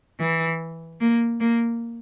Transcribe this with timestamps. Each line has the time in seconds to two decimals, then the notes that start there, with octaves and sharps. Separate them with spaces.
0.20 E3
1.00 A#3
1.40 A#3